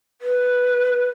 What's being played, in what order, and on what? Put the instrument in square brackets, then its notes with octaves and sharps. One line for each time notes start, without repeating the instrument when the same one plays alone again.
[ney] B4